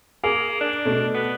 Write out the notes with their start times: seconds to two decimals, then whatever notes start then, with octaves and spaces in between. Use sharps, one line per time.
0.24 A#3 G#4
0.61 D4
0.85 B2 A3
1.14 B3